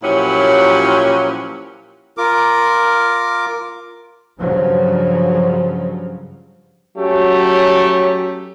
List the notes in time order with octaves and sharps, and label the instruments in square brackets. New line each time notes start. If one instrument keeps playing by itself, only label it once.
[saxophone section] A#2 F3 F#3 C#4 E4 G4
[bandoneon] F4 A#4 D6
[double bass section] G2 C#3 F3 F#3
[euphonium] F#3 [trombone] A3 [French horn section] C#4 G4